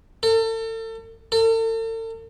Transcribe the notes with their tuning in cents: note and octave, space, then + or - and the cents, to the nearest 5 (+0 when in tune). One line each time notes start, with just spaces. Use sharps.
A4 +40
A4 +45